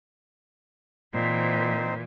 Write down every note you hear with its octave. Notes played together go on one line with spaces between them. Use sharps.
A#2 E3 C4 D#4 C5